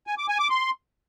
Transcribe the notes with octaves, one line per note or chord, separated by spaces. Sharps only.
G#5
D6
G#5
D6
C6